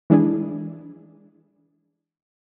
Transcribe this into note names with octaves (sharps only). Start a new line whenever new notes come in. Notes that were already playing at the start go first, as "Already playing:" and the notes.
E3 G#3 D4 E4 G#4